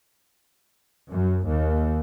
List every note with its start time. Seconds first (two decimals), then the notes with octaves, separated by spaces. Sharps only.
1.11 F#2
1.46 D#2